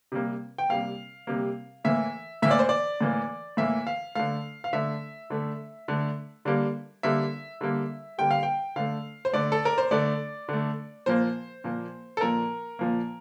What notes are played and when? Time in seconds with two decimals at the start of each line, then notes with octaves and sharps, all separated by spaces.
0.12 C3 G3 A#3
0.58 G5
0.69 C3 G3 A#3 F5
1.27 C3 G3 A#3
1.84 A2 E3 A#3 E5
2.42 A2 E3 A#3 E5
2.51 D5
2.59 C5
2.69 D5
3.01 A2 E3 A#3
3.57 A2 E3 A#3 E5
3.87 F5
4.15 D3 A3 F5
4.64 F5
4.73 D3 A3 E5
5.30 D3 A3
5.88 D3 A3
6.45 D3 G3 A#3
7.03 D3 G3 A#3 E5
7.61 D3 G3 A#3
8.18 D3 G3 A#3 G5
8.31 F5
8.43 G5
8.76 D3 A3 F5
9.25 C5
9.33 D3 A3 D5
9.52 A4
9.65 A#4
9.78 C5
9.91 D3 A3 D5
10.49 D3 A3
11.06 A#2 F3 A#3 C5
11.64 A#2 F3 A#3
12.17 A4
12.21 A#2 F3 A#3 A#4
12.79 A#2 F3 A#3